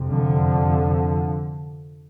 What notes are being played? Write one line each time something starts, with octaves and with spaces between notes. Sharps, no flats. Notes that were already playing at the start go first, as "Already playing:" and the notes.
Already playing: F2 C3
D3 F3